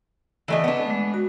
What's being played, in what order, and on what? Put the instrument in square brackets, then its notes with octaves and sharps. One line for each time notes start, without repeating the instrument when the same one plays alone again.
[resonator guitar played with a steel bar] E3 A3 D#5 [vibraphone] D5
[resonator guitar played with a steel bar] B3 D4
[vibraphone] G#3 A3
F#4